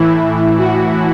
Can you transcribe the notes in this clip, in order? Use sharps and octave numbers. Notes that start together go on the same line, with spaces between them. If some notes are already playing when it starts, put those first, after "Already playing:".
Already playing: A2 E3 E4
F#4